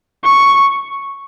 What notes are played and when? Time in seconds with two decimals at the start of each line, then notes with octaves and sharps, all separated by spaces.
0.24 C#6